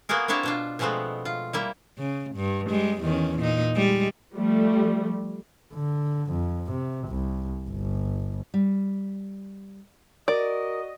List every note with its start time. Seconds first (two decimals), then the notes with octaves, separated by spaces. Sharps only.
0.09 A#3 B3 F#4 G#4 A#4
0.28 A#3 C4 D4 E4 C#5 A5
0.43 B2 D4 F4
0.79 B2 F3 G#3 A3 B3 C4
1.25 F4
1.53 G3 A#3 E4
1.98 C#3
2.36 G2
2.69 G3 G#3
3.02 E2 D#3 C#4
3.39 A#2 D#4
3.75 G3 G#3
4.33 F3 G3 A3
5.74 D3
6.31 F2
6.72 C3
7.09 C2
7.70 G1
8.54 G3
10.28 F#4 A#4 D5 D#5